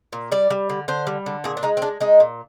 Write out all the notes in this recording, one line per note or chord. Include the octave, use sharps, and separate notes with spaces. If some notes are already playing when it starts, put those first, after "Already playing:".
A#2
G3 D5
G3
D3
D3 C5
G3
D3
A#2 G#4
D4
G#3 D#4
C4
G#3 D4
G#3 D#4
A#2